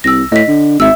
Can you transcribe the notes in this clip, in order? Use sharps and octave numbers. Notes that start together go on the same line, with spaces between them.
C2 E6 A#6
A2 D#5 B6
D3
G#1 E5 E6